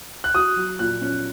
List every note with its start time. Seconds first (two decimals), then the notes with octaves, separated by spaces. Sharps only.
0.24 F#6
0.35 F#4 D#6
0.56 F#3
0.79 A#2 F#6
1.01 C#4